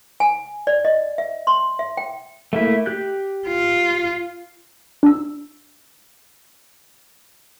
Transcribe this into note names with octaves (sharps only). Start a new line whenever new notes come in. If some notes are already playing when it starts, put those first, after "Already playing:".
G#5
D5
D#5
E5
C6
E5
G5
A3 A#3 E4
G4 F#6 G6
F4
D4 E6